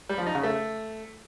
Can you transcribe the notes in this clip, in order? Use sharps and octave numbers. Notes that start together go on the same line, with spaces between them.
G3
F3
D#4
C#3
A3